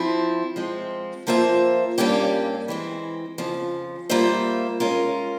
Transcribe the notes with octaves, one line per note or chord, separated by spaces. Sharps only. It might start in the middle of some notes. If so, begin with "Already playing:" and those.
Already playing: F3 C4 E4
F3 G#3 C4
F3 A#3 F4 C5 E5
G2 G3 A#3 C#4 G4
E3 G#3 C4
F2 C#3 F3
G3 A#3 F4 C5 E5
G#3 C#4 F4 A#4